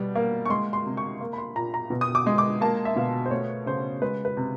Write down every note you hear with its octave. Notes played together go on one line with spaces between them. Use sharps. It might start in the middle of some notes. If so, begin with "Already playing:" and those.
Already playing: B2 G3
A#3
C#6
G#3 C6
C6
C3
C#6
A#3
B5
C6
A#2 A#5
A#5
B2
D#6
D6
G#3
D6
A#3 A5
E5
B2 F5
C5
A3 C#5
C#3 C5
G#3 B4
B4
C3